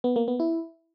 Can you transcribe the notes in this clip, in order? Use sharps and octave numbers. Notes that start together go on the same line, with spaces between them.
B3
A#3
B3
E4